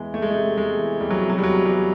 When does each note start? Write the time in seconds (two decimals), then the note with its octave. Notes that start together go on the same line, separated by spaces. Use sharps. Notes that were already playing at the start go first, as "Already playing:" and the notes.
Already playing: E2 E3 G#3
0.13 E2 A3
0.22 G#3
0.31 A3
0.35 C3
0.58 E2 G#3
0.79 E3
1.00 E2 G3
1.10 F#3
1.23 C3
1.30 F#3
1.38 G3
1.43 E2 F#3
1.66 E3 G3